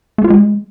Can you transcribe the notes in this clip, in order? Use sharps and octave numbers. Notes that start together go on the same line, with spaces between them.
A3
F4
G#3